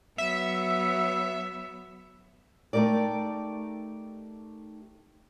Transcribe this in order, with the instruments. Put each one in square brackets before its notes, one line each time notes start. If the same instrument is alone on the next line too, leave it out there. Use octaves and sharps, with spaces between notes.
[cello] F#3 B3 [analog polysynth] E5
[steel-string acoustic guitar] A3 D#4 G4 A#4 D5